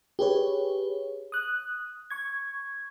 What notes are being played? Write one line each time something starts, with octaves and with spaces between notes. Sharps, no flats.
G4 G#4 B4 C#5
D#6 F#6
C#6 G#6